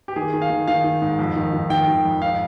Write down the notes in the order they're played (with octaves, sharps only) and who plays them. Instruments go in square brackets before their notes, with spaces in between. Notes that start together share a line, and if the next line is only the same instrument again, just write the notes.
[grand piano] G4
D#3 G#4
D#3
F5
D#3
D#3 F5
D#3
G#2
F2
D#3
D#3
D#3 G5
D#3
F2
G#2 F5